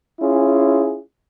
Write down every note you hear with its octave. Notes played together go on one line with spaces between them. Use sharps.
C#4 E4 F4 G#4